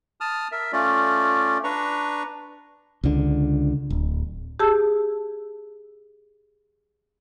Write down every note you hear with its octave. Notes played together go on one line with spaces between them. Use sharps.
A5 D#6 F6
A#4 E5
A3 C#4 F4 D5
D4 B4 A#5 C#6
C#2 D3
D1
G4 G#4 A5 E6